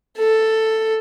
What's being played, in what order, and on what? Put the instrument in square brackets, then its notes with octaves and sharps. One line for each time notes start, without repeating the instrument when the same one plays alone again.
[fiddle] A4